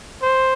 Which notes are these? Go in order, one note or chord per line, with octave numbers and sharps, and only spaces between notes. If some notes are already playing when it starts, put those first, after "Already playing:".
C5